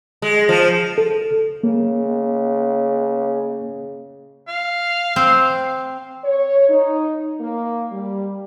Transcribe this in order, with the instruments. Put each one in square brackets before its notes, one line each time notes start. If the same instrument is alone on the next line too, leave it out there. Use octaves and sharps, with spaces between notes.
[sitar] G#3
F3
[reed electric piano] A4
[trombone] C#3 [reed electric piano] A#3
[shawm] F5
[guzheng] C4
[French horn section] C#5
D#4
A#3
G3